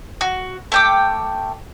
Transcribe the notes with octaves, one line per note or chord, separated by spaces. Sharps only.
F#4
A3 G5 D6